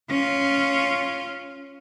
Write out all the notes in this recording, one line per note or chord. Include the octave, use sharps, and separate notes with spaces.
C#4 F4